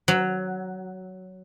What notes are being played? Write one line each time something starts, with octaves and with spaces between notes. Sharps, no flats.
F#3